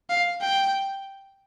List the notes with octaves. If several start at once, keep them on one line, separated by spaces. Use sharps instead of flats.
F5
G5